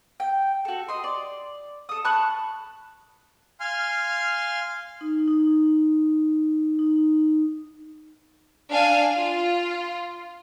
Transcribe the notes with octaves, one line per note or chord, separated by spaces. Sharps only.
G5
F#4 A4
D#5 C6
D5
A4 D#6
A5 B5 C#6 F#6
F5 G#5 C6 F6
D#4
D#4
D#4
D4 F5 G#5
F4